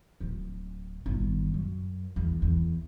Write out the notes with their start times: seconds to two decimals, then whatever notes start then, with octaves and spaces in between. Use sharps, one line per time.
0.20 D1
1.06 G1 D#3
1.54 F#2
2.16 E2
2.42 E2